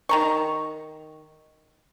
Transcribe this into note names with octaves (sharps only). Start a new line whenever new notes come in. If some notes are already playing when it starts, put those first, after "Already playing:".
D#3 A#5 C#6